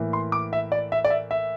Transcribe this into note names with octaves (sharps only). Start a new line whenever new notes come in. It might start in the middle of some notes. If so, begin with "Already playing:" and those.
Already playing: A2 E3 A#3
C6
D6
E5
D5
E5
D5
E5
E5